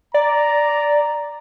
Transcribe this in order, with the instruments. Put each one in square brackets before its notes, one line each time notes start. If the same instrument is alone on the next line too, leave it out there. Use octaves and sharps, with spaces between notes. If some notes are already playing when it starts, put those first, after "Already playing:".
[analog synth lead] D5 [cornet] A#5